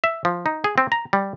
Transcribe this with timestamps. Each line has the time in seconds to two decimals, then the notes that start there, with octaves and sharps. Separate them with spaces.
0.04 E5
0.25 F3
0.46 D#4
0.64 G#4
0.78 C4
0.92 A#5
1.13 G3